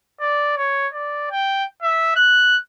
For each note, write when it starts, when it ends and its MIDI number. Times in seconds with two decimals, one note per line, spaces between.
0.20 0.52 74
0.57 0.87 73
0.93 1.27 74
1.31 1.65 79
1.82 2.15 76
2.16 2.57 90